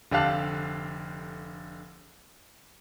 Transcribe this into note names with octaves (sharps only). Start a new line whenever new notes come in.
F1 D3 G4 F5 A5 F#6